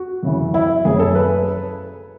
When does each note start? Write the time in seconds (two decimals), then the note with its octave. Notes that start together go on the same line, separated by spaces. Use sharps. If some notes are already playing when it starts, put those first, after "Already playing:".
Already playing: F#4
0.23 F#2 C#3 E3
0.54 E4
0.85 F#1 F#2 C#3 G#4
0.99 A4
1.15 B4